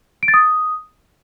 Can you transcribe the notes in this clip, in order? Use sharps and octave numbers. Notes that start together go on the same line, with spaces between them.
D7
A6
D#6